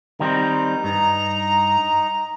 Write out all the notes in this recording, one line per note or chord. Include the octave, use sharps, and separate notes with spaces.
D#3 G3 C4 D#4
G2 A#5